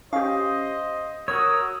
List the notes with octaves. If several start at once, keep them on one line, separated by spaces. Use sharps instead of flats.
C#4 G4 C5 D#5 F5
F#4 A#4 C#5 D#6 E6